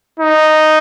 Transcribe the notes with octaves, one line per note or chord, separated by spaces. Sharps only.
D#4